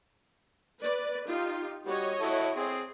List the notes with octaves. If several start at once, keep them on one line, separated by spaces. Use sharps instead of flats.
B4 D5
D#4 F4 G4
G3 F#4 C#5 D#5
E4 F#4 A4
C4 G#4